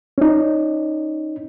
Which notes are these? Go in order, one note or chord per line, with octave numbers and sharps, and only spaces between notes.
C#4 D#4